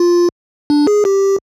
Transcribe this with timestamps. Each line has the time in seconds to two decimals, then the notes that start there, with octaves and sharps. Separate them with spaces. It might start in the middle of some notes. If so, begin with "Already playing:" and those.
Already playing: F4
0.70 D4
0.87 G#4
1.05 G4